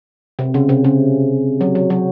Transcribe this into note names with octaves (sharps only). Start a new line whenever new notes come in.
C3
C#3
C3
C#3
F#3
F#3
F#3